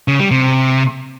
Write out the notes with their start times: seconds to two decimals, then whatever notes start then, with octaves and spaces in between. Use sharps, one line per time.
0.08 C#3
0.19 G3
0.31 C3